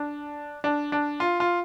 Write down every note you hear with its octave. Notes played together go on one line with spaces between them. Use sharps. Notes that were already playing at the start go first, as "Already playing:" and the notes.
Already playing: D4
D4
D4
F4
F4